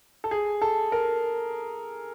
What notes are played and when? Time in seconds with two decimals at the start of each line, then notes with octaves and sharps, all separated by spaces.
0.24 A4
0.31 G#4
0.62 A4
0.92 A#4